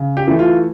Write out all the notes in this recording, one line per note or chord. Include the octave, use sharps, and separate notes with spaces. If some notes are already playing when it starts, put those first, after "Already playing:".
Already playing: C#3
G4
E3 A3
F4